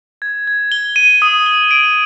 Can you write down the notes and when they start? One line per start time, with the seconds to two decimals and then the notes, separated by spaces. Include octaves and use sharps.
0.22 G#6
0.47 G#6
0.72 G7
0.96 D#7
1.22 D#6
1.46 G7
1.71 D7